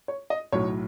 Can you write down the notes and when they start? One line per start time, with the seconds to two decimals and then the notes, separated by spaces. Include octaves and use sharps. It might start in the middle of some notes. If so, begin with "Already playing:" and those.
0.08 C#5
0.30 D#5
0.52 B1 A2 F#3 C#5